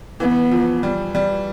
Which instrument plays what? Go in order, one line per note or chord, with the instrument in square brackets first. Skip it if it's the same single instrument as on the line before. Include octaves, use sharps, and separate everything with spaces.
[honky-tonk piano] E3 [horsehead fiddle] B3
[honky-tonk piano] F3
G3
G3